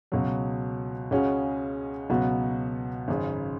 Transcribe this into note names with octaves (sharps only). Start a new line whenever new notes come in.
C#2 B2 F#3
C#2 C#3 G#3 C#4 F#4
C#2 B2 F#3 B3 F#4
G#1 F#2 C#3